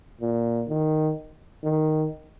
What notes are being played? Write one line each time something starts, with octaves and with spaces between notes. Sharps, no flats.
A#2
D#3
D#3